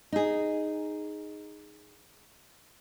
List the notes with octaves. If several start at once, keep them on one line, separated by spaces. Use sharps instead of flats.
D#4 G#4